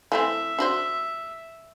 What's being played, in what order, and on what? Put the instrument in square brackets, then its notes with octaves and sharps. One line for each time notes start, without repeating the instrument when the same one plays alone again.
[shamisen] E3 A3 C4 [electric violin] E5
[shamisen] D4 F#4 C5